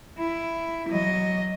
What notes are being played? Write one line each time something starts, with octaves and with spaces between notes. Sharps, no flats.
E4
F#3 D#5